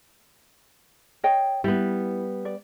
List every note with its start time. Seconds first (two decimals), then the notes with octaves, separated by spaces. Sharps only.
1.24 C#5 D#5 G5
1.64 G3 B3 E4
2.45 D5